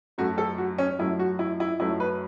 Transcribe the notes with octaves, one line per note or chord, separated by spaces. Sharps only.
F#2 F#3 A3 F#4
A4
F#4
C#4
F#2 F#3 A3 E4
F#4
E4
E4
F#2 F#3 A3 E4
B4